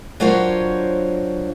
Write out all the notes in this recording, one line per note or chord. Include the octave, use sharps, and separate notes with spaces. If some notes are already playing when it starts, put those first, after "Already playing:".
F#3 D4 F4 A#4 C5 C#5